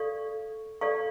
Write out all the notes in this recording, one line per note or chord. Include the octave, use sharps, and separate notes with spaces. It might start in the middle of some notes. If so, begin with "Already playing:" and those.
Already playing: A4 D5 F5 C#6
A4 D5 F5 C#6